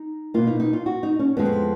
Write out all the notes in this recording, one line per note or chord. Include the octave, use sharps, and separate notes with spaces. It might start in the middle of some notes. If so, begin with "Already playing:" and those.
Already playing: D#4
B2 A#3 F4
D#4
D#4
F4
F#4
D#4
C#4
F2 F3 G#3 B3